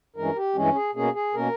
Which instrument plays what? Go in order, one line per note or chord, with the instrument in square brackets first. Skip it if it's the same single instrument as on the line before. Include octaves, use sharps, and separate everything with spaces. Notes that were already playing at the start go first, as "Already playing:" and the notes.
[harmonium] G2 E3 G#3 C#4 A#4
G4
G2 E3 G#3 C#4
G#4
B2 A#3 C#4 G#4
G#4
B2 A#3 C#4 A#4